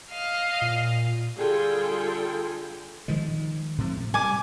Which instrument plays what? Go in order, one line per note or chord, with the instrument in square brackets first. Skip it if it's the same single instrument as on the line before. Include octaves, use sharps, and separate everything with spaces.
[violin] D#5 F5
[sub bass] A#2
[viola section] D3 G3 F4 G#4 A4 G5
[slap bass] D#3 F3 G#3
A2 C3 F3
[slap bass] G3 [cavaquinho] G#5 D6